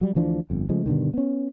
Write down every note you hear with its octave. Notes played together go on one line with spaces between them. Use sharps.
F#3 G3
D2 E3 F3 D4
G1 F2
C#3 F3 G#3 A3
G2 B2 D3 D#3
B3 C#4